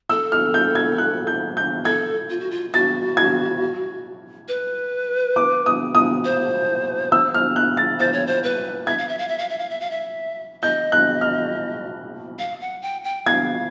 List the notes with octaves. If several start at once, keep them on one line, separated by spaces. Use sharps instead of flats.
A4 E6
F6
G6
G#6
F#6
G6
G6
A4 G#6
F4
F#4
F4
F#4 A6
G#6
B4
D6
D#6
D#6
C5
E6
F6
F#6
A6
C5 A6
C#5
C5
B4
E5 G#6
F5
E5
F5
E5
F5
E5
F5
E5
F5
E5
D#5 G6
F#6
F6
F5
F#5
G5
G5
F5 G#6